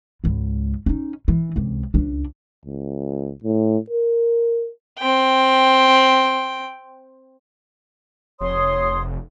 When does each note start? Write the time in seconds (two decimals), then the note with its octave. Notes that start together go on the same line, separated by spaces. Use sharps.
0.24 C#2 G#2
0.86 C#4 D#4
1.28 E3
1.56 C#2 C3
1.94 C#2 D4
2.65 C#2
3.44 A2
3.90 A#4
4.99 C4 G5
8.41 F1 C#5 C6 D#6